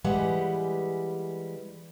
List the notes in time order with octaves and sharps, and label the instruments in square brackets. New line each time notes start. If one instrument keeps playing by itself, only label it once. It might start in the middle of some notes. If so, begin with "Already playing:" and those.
[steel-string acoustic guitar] E3 G3 G#3 B4 F#5